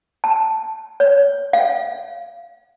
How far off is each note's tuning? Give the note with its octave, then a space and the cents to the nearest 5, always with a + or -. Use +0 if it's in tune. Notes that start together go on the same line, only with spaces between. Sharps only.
A5 +0
C#5 +20
F5 -25